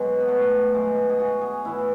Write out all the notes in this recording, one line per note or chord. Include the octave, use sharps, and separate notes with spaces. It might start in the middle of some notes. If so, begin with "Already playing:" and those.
Already playing: B2 F#3 G#3
B3
A3
B2 F#3 G#3
G#4
F#4
G#4
A2 E3 E4